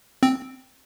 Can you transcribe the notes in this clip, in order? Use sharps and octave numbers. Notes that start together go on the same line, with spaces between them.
C4